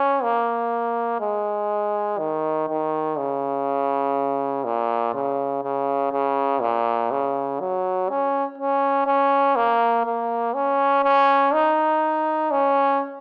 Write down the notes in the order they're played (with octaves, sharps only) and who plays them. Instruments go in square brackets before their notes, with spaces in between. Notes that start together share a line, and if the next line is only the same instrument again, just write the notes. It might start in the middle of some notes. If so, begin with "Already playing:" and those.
Already playing: [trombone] C#4
A#3
G#3
D#3
D#3
C#3
A#2
C#3
C#3
C#3
A#2
C#3
F#3
C#4
C#4
C#4
A#3
A#3
C#4
C#4
D#4
C#4